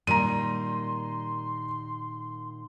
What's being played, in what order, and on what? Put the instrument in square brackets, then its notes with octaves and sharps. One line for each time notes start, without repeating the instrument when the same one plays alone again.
[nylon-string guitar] A#2 D#3 G3 [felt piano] A#5 D#7 [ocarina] C6